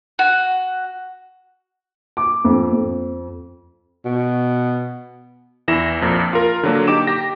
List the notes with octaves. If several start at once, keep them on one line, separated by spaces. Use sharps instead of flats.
F#4
D6
F2
F2
B2
E2 E3 E4 A#6 E7
A#1 F2 A#2
F4 A#4
D3 F#3 A#3
D#4 G4 D6 E7
G4 A#6